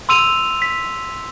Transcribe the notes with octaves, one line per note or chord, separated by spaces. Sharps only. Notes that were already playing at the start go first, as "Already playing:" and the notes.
C6 E6 D#7 F7
B6